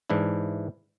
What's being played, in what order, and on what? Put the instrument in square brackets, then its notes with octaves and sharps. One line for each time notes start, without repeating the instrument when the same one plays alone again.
[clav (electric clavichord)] G#2 E3 D4 E4